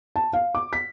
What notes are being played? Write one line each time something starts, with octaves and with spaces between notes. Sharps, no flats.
A5
F5
D6
B6